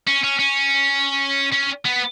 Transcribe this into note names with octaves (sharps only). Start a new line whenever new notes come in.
C#4
C#4
C#4
C#4
B3